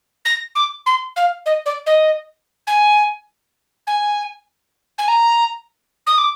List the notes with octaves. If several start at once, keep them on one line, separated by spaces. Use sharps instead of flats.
A#6
D6
C6
F5
D#5
D5
D#5
G#5
G#5
G#5
A#5
D#6
D6